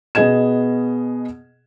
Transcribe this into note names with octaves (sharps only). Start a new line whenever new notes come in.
B2 B3 G#4 D#5 G#6 E7